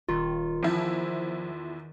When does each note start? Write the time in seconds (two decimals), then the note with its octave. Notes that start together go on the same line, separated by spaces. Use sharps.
0.09 D#1 D#3 F4
0.63 E2 F3 E4